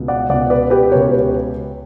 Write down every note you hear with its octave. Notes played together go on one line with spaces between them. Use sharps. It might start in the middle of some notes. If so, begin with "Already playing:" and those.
Already playing: C#2 B2
D5 F#5
C#2 B2 D5 F#5
B4 D5
G4 B4
C#2 B2 A#4 C#5
G4 B4